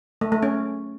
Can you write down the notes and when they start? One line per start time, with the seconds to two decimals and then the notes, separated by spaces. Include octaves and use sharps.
0.21 A3
0.32 A3
0.43 C#4